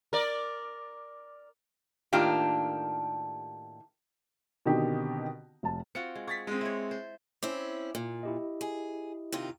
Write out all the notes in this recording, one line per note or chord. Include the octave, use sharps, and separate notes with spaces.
A#4 D5
A2 D#3 A#3 D4 F4 G4
B2 D3 D#3 C4 D#4 G4
F1 A5
C4 F4 F#4 C#7
G#3
G#4 C#6 A6 B6
G#3 C4 D#5
E4 C#5
C5
C4 C#4 E4 D6
A#2
E4 G4 D#5
G#4
C3 D#3 F4